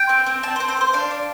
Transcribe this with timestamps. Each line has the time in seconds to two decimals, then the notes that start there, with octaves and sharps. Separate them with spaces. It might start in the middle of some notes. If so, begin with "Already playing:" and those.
Already playing: G5
0.09 C4
0.26 C4
0.43 C4 A5
0.56 C5
0.60 C4
0.68 C5
0.77 A4
0.81 C5
0.93 D4 F5
1.11 D4